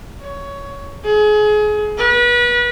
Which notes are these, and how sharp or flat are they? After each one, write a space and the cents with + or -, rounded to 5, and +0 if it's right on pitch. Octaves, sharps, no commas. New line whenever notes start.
C#5 +15
G#4 +30
B4 -35